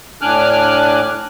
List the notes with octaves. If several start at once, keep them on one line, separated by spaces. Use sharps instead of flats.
A2 D4 G#5 D6 F6 F#6